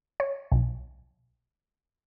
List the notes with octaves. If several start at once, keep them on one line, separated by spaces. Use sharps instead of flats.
C#5
B1